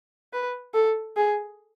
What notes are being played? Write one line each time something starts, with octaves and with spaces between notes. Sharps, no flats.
B4
A4
G#4